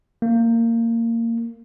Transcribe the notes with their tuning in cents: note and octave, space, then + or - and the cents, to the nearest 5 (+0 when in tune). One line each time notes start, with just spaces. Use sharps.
A#3 -20